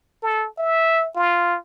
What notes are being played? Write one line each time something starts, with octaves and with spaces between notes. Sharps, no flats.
A4
E5
F4